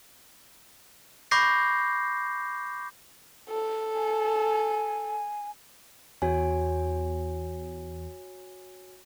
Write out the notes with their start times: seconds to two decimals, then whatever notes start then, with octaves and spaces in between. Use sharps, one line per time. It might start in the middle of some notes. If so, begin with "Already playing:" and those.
1.31 B5 C#6 D6 G6 A#6 C7
3.49 A4
3.94 G#5
6.22 E2 F#4 C#5 G#5